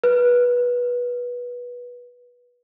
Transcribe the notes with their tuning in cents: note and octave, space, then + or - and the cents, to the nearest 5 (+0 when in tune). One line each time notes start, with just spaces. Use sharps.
B4 -20